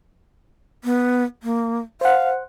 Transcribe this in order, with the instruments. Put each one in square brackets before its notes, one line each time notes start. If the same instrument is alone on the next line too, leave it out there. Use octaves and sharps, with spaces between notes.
[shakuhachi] B3
A#3
[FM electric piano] C5 F#5 [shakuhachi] F5